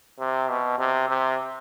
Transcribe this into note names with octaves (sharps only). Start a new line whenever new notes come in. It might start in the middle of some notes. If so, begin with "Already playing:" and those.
C3
B2
C3
C3